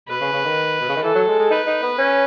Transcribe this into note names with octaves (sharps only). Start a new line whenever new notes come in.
B2 B4
C#3
C#3
D#3
B2
C#3
D#3
E3 A4
F#3
G#3
G#3
D#4 B4
D#4
B3
C#4